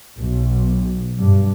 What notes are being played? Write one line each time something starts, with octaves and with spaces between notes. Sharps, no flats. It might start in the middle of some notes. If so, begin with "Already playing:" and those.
B1
G2